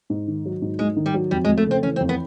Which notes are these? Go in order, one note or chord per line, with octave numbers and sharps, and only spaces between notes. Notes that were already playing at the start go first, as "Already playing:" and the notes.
G#2
D#3
F#3
G#2
G#2 G#3
D#3
G3
F#3
F2 G3
G#3
F2
A3
C#3 C4
E3 C#4
C4
F2
B3